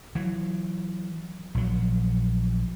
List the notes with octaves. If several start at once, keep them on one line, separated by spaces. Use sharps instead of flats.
E3 F#3
A#1 F#3